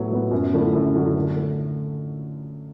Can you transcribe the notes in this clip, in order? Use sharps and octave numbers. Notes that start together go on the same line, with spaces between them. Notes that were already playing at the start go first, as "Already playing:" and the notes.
Already playing: A2 F#3 B3 F#4 B4
F#3 B3 F#4 B4
F#2
D3 F#3 A3 E4
F#2
D3 F#3 A3 E4
D3
A3